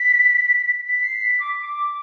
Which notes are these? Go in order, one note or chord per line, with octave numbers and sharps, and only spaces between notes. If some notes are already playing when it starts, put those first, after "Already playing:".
Already playing: B6
B6
C7
B6
D6
D6